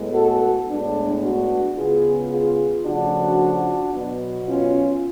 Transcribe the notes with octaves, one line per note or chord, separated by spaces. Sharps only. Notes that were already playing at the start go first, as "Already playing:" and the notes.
Already playing: A2 G#3 B3
F#4 A4
A2 G#3 B3 D4
D4 F#4
C#3 G#3 B3 F4 G#4
F4 G#4
C#3 F3 A3 D4 F#4
B2 F#3 B3
C#4 F4